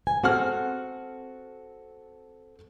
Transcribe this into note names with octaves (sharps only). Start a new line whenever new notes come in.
G#5
C4 F#4 A4 F#5 F6